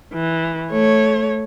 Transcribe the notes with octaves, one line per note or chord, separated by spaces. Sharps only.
E3
A3 C#5